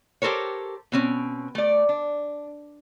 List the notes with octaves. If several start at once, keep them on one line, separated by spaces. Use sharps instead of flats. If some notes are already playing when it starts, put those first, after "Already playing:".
G4 A4 A#4 C5 C#5
B2 C4 C#4
A3 D5
D4